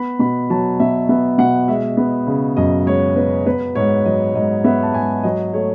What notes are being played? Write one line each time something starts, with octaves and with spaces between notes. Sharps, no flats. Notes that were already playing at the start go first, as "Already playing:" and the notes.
Already playing: B3 B5
B2 B5
F#3 A5
B2 E5
B3 E5
B2 F#5
G#3 E5
B3
C#3
F#2 D#5
G#3 C#5
B3 B4
B3 B4
G#2 C#5
F#3 D#5
G#2 D#5
B3 E5
A5
G#2 G#5
F#3 D#5
A3 C#5